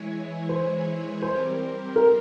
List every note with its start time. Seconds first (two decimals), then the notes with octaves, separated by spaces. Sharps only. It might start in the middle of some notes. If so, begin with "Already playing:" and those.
Already playing: E3 G#3 E4 G#4 C#5
0.49 C5
1.22 G3 C4 G4 A#4 C5
1.96 A#4